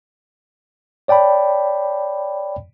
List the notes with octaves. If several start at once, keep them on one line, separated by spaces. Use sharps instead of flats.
C#5 D5 G5 A5 B5